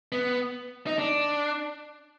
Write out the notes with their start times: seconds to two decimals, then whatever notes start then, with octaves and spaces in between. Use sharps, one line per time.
0.12 B3
0.87 D#4
0.98 D4